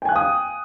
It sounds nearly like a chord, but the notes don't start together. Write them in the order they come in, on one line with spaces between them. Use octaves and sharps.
G5 G#5 F#6 F5 D#6